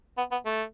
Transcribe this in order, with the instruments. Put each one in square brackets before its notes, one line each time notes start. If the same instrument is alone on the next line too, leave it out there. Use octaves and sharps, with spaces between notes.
[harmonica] B3
B3
A3